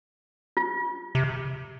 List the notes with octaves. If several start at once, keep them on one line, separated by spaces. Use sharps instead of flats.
F4
C3